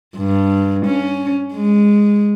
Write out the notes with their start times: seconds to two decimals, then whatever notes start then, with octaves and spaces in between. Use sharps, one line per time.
0.17 G2
0.86 C#4
1.54 G#3